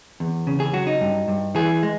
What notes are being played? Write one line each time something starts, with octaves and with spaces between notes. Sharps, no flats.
E2
C#3
G#4
F#3 F#4
D#4
G2
G2
E3 G#4
G#3